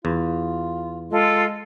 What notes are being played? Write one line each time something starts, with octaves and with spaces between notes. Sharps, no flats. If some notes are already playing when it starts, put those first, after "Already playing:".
E2 F4
G#3 F4 A4